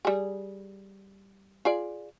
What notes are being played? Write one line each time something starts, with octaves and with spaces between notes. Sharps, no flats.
G3 G#4
F4 G#4 D5